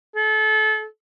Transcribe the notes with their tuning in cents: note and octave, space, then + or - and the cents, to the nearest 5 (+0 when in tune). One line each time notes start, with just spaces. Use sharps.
A4 -30